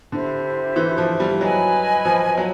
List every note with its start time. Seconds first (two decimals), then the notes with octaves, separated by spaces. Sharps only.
0.12 D3 E4 G4 C5 E5
0.76 E3
0.98 F3
1.20 G3
1.40 F#3 B4 D#5 G#5 B5
2.05 F3
2.37 F#3